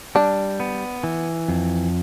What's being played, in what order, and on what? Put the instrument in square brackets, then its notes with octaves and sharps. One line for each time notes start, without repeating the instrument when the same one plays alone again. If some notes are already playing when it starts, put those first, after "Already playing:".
[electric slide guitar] G3 [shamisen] D4
[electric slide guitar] B3
E3
F2